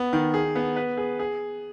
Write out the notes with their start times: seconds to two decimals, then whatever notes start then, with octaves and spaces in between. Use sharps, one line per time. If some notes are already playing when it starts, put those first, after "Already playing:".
Already playing: B3
0.13 D#3
0.34 G#4
0.56 B3
0.76 B4
0.97 G#4
1.19 G#4